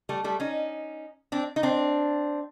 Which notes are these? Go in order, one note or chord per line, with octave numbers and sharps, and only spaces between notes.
G3 A3
G3 A3
C#4 D#4
C4 D4
D#4
C4 D4